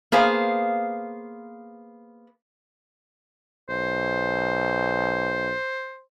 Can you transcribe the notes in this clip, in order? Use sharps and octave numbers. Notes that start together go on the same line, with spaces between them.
A#3 B3 G#4 C5 F5
B1 C5